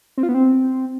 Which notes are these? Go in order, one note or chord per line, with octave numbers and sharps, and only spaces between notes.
C4
F4
B3
C4